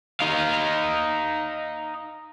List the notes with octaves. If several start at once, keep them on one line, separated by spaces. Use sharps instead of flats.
D#4 F5